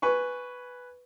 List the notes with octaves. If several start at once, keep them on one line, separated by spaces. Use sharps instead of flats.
B4 G#5 C#6